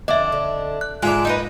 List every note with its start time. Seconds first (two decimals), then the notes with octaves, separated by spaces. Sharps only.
0.08 F2 D3 D4 D#5 E5
0.32 D3
0.81 F#6
1.02 G#2 G#3 D4 F4 E5 A#5
1.25 D#4 A#4 B4